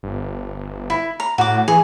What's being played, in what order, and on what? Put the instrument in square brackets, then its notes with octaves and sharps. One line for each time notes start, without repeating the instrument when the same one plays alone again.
[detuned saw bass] G1
[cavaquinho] E4
A#5
[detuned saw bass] A2 [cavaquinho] F#4 D6
[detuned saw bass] E3 [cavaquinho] G#4